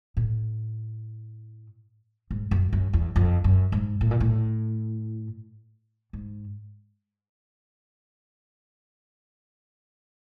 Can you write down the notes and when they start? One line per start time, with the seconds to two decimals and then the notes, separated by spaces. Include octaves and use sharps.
0.17 A2
2.31 G#2
2.51 F#2
2.73 F#2
2.93 E2
3.16 F2
3.44 F#2
3.72 G#2
4.01 A2
4.11 A#2
4.20 A2
6.13 G#2